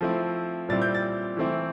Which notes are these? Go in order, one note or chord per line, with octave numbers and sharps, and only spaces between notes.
F3 A3 C4 E4
A#2 G3 C4 E4 A6
G6
A6
E3 A3 C4 E4